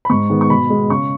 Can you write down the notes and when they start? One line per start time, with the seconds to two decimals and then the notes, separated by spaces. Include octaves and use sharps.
0.05 B5
0.10 G#2 C#6
0.30 D#3 G#3 B3
0.41 C#6
0.50 B2 B5
0.70 G#3 B3
0.90 C#3 C#6